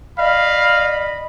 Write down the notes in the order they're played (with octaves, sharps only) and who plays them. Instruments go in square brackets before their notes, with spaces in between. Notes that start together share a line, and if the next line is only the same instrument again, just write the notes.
[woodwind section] D5 D#5 B5 [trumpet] F5